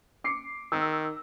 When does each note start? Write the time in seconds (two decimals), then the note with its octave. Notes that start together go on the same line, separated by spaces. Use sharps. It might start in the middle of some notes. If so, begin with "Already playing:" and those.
0.24 D6 C7 C#7
0.72 D#3 E6